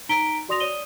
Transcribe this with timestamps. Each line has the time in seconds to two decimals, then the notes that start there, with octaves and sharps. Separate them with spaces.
0.09 D#4 A#5 B6 D7 G7
0.49 F#4 D5 C6 D#6 A#6 F7
0.60 C#5 D5 D#6 D#7 G7